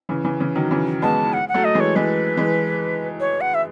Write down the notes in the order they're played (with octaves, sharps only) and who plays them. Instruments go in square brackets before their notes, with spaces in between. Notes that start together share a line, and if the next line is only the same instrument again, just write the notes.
[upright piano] C#3 E3
C#3 E3
C#3 E3
D#3 F#3
C#3 E3
[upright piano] G#3 B3 [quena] A5
[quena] F#5
F#5
[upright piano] F#3 A3
[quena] D#5
[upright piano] E3 G#3
[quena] C#5
[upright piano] E3 G#3 [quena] B4
[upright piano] E3 G#3
[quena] C#5
F#5
E5